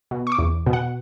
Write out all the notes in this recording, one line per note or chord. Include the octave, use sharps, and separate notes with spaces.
B2
C#6
D6
E2
B2
F#5